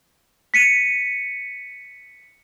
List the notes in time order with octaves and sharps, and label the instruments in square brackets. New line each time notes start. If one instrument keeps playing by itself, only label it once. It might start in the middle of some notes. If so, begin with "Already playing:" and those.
[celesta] B6 C#7 D#7